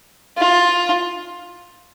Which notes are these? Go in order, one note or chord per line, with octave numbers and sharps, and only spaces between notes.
F4